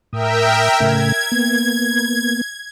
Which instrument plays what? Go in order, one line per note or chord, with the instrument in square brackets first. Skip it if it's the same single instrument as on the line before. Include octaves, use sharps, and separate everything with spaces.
[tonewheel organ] A2 D#6 [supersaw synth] A#4 E5 G5
[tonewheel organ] A2 C#3 A3 [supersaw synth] G#6
[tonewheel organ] A#3 B3